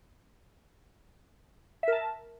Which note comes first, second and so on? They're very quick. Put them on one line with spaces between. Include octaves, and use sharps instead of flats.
E5 A#4 A5